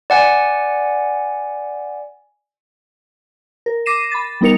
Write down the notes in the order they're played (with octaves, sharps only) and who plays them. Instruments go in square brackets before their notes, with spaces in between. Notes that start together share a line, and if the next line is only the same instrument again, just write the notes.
[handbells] D5 F#5 G#5
[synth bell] A#4
D6 A#6 C7 D#7 E7
B5 A6
G3 B3 D#4 A#4 C#7 F7